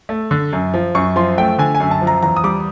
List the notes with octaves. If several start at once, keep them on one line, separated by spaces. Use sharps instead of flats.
A3
D3
F#2
F3
F#2 C#6
F3 C6
A3 G5
D3 G#5
G#5
F#2
A5
F3
A#5
E2 A#5
D#6
G3 D6